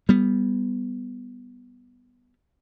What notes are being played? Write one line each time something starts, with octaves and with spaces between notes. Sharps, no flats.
G3 B3